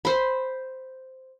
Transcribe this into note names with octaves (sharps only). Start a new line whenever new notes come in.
C5 B5